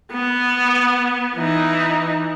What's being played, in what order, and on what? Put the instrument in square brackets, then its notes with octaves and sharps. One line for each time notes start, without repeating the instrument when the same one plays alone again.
[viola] B3
E3 D#4